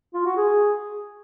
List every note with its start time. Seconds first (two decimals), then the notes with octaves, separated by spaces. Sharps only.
0.14 F4
0.26 F#4
0.37 G#4